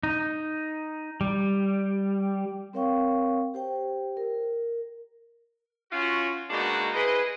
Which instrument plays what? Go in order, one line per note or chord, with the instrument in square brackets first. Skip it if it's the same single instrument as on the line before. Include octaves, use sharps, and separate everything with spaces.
[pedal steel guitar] D#4
G3
[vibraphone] C4 A#4 C#5 F5 G5 C#6
G4 C5 G5
A#4
[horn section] C#4 F4 F#4
B2 G#3 A#3 D4 D#4 F#4
E4 G#4 B4 C5 D#5